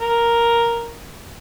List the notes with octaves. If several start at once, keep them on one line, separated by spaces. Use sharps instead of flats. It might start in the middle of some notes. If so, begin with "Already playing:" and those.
A#4